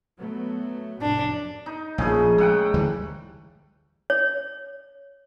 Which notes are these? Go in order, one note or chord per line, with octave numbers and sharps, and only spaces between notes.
F#3 A3 B3
F1 F#2 A2 D4
D#4
A#1 C#3 F3 A3 G#4
G#3 A3 F#5 G5
D2 E3 G3
C#5